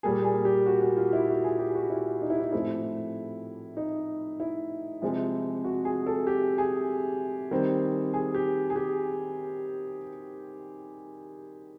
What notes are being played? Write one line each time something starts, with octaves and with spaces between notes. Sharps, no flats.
A#2 G3 A#3 G#4
G#4
G4
F#4
F#4
F4
E4
F#4
G#4
G4
F#4
E4
D#4
E4
D#4
A2 F3 A3 C4 E4
D#4
E4
C3 F3 G#3
F#4
G#4
A4
G4
G#4
D#3 G3 C4
G#4
G4
G#4
G4